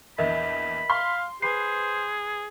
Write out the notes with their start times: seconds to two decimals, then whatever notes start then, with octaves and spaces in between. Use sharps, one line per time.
0.18 A#1 E2 A#4 D#5 E5 B5
0.90 F5 C6
1.42 G#4 B4 C5 C7